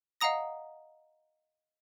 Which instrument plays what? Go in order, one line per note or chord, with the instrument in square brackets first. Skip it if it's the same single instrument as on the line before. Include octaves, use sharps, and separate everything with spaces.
[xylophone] D#5 F5 F#5 A#5 D#6 A#6